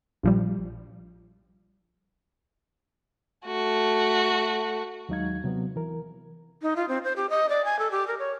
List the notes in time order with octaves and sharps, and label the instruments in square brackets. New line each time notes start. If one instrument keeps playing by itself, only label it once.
[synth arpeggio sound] A#1 F3 G3
[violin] A3 F#4
[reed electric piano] D#2 F#3 G#3 D#4 F5 G#6
C3 F#3 B3
E3 A#4
[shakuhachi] D#4
F4
C4
C5
G4
D#5
D5
G#5
A4
G4
A#4
C#5